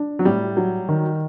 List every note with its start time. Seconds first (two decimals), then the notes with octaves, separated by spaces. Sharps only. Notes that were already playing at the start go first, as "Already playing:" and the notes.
Already playing: D4
0.19 F#3
0.25 A2 G3
0.57 F#3
0.89 D#3